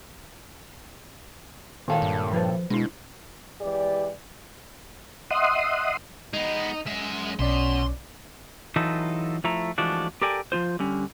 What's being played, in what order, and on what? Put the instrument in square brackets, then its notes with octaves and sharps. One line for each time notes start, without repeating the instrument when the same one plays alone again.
[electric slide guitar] A#2 A4 [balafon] D#3 F5 G5
[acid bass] G2
[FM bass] F3 [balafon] B4 C5
[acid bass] B2 [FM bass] G#3 [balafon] D4 E4
[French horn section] E3 G#3 G4 D5
[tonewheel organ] D#5 E5 F#5 C6 D#6
[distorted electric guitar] G#3 B3 [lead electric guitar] D#4
[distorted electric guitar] F#2 E5 [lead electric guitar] G#3
[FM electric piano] B1 D5 [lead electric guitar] B2 [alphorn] C#4 [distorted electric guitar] C6
[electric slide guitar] E3 F#3 D#4 F4 A4 B4
F3 A3 E4 A#5
E3 F3 G#3 A3 D4 F#4
G4 A4 A#4 D5 G5 G#5
F3 B3 F4 C5
D3 G3 C#4